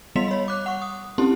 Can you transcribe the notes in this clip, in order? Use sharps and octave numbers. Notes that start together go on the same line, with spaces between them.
G3 B3 D#5 C6 B6 F7
C#5 B5
D6 F#6
F#5 C#6
D#6
C4 C#4 E4 G4 A5 C6